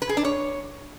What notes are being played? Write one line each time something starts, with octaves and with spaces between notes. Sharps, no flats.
B4
G#4
D4
C#5